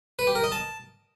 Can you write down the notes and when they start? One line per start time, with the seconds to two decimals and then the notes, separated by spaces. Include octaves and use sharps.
0.19 B4
0.27 G4
0.35 A#4
0.44 D#5
0.52 A5